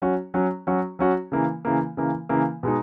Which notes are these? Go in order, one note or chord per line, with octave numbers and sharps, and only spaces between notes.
F#3 C#4 F#4
F#3 C#4 F#4
F#3 C#4 F#4
F#3 C#4 F#4
C#3 E3 A#3
C#3 E3 A#3
C#3 E3 A#3
C#3 E3 A#3
B2 G#3 D#4